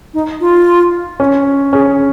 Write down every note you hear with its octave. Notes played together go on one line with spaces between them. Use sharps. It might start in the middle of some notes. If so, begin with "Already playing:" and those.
D#4
F4
C#4
C#4 G#4